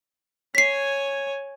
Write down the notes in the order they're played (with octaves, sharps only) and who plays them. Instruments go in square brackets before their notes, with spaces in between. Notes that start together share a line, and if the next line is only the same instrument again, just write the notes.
[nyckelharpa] C#5 G#5 [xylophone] B6 C7